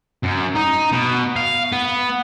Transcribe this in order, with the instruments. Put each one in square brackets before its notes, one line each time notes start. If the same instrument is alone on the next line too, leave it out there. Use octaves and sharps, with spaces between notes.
[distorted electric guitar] F#2
D#4
B2
F5
B3